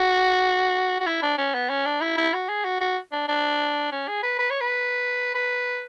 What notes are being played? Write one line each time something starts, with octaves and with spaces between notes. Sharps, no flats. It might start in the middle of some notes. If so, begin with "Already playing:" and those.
Already playing: F#4
F#4
E4
D4
C#4
B3
C#4
D4
E4
E4
F#4
G#4
F#4
F#4
D4
D4
C#4
G#4
B4
B4
C#5
B4
B4